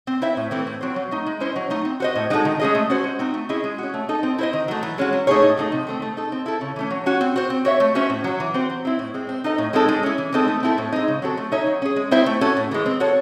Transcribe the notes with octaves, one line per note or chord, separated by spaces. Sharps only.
C4
E4 C5 E5
A2
E3 A3 C4
A2
F#3 C4 F#4 C5
F#3
A3 D#4
G#3
C#4 E4 C5 D#5
F#3
A3 D#4
C4
F#4 C5 D#5
A2
G#3 D#4 F#4 A4
D#3
G#3 C#4 G#4 D#5
A3
C#4 F#4 C5
G#3
C4 D#4 F#4
A3
C#4 E4 G#4 D#5
G#3
C#4 F#4
A3
D#4 A4
C4
E4 C5 D#5
D#3
F#3 A3
E3
G#3 C#4 F#4
F#3
A3 D#4 G#4 C#5
A2
F#3 A3 D#4
C3
D#3 A3 C4
A3
D#4 A4
C4
E4 A4
C#3
E3 A3 C#4
F#3
C#4 F#4
C4
F#4 C5
C4
F#4 C#5 E5
A3
C#4 F#4 C5 E5
A2
F#3 C#4
E3
C4 F#4 C5
F#3
C4 E4
A2
G#3 C4
C4
D#4 A4 D#5
A2
G#3 C4 D#4 A4
G#3
C#4 E4
E3
G#3 C4 D#4 A4
A3
C4 E4 A4
A2
G#3 C4 D#4
C#3
F#3 C4 F#4 A4
A3
D#4 A4 C#5 E5
F#3
C#4 G#4
G#3
C4 E4 C5 E5
A3
C#4 F#4 A4
A2
E3 G#3
C4
F#4 A4 C#5